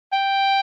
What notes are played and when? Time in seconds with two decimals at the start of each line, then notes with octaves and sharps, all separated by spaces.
0.13 G5